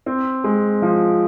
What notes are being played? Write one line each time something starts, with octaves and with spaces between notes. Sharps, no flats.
C4
G#3
F3